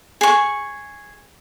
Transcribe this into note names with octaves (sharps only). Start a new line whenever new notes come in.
G#4 C#6